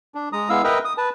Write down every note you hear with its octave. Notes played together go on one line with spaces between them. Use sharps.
D4
G#3 A#5 D#6
G#3 B3 E4 F5 E6
A#4 B4 D#5 E5 G5 A#5
D#6
B4 A5